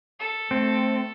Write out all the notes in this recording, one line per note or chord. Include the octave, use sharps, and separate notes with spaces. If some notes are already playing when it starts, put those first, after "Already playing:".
A4
A3 C4